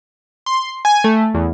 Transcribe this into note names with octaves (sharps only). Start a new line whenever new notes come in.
C6
G#5
A3
E2